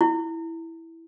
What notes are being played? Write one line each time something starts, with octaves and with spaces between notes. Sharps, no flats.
E4